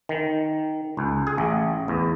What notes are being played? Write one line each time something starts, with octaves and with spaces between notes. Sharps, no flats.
D#3
C#2
G#4
A1
E2